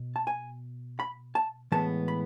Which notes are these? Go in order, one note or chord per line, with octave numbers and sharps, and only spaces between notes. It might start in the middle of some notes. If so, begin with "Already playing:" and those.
Already playing: B2
A5
G#5
B5
A5
A2 E3 G#3 B3 A5
B5